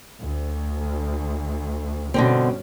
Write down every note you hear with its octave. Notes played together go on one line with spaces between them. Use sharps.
D2
G1 B2 D3 C4 C#4